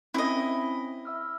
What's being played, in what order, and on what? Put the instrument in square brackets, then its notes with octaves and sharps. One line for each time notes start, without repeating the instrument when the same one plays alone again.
[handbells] C4 C#4 [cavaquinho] E4 D#5
[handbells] E5 E6 F6